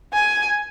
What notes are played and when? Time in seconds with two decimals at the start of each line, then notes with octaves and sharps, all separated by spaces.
0.14 G#5